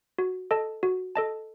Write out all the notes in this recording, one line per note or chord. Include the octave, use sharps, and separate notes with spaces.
F#4
A4 D#5 A5
F#4
A4 D#5 A5